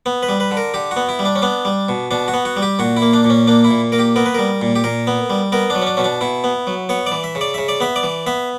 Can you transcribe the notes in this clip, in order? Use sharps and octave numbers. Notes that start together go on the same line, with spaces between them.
B3
B4
G3
B4
D3
A#4
D3 G4
F#4
B3
E4
G3
D4
C#4
B3 D4
G3
B2
B2 D4
F#4
B3
F#4
G3
G4
A#2 F#4
E4
A#3
D4
A#2
C#4
A#3 D4
E4
A#2
A#3 A#4
G4
B3 A#4
B4
G3 A#4
A#2
G4
A#2 A#4
B3
G3
B3 A#4
D4
F#3
C#4
D4
B2 C#4
D4
B2 E4
B3
F#3
B3 C#5
D5
E3
E5
C#3
D5
C#3 E5
D5
B3 E5
D5
E3
B3 E5